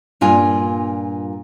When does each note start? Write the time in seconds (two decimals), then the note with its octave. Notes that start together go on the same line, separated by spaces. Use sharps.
0.21 G2 A#2 F4 G#5